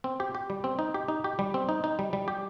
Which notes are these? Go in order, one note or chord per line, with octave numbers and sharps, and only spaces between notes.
C4
G4
G4
G3
C4
D#4
G4
D#4
G4
G3
C4
D#4
D#4
G3
G3
G4